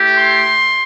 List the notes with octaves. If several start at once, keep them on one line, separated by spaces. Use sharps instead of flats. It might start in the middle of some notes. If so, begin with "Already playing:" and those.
Already playing: A3 E4 G4
C6